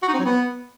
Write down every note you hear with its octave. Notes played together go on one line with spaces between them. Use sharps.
F#4
D#4
C4
F#3
B3